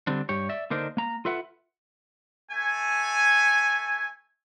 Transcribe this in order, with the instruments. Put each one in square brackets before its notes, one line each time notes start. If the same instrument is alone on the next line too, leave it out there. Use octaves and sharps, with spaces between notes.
[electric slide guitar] D3 G3 C4 D4
G2 G4 C#5
D5 E5
D3 A#3 D4 D#4 A#4 C5
A#3 A#5
F4 A4 B4 E5 F#5
[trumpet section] A3 G#5